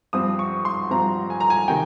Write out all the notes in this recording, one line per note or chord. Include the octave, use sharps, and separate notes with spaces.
G2 F3 C4 D#6
C#6
C6
G2 F3 C4 A#5
G#5
A#5
G#5
C3 D#3 G5